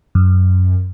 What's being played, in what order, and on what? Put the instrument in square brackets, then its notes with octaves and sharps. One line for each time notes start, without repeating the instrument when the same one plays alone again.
[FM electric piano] F#2